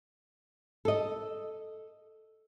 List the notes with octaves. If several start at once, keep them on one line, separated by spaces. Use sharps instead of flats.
A4 D#5